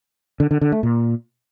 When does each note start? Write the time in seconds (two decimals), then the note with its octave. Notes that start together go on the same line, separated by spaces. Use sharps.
0.40 D3
0.51 D3
0.61 D3
0.72 A3
0.83 A#2